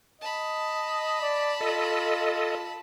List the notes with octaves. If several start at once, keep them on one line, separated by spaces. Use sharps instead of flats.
D#5 A5 B5
D5
F4 A4 D#5